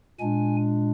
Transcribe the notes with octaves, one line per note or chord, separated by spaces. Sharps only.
A#2 G#3 D4 G#5